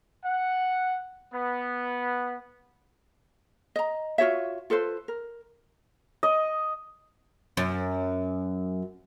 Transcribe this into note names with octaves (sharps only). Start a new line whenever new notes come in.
F#5
B3
D#5 A#5
F4 F#4 C#5 E5
F4 A4 B4 C5
A#4
D#5
F#2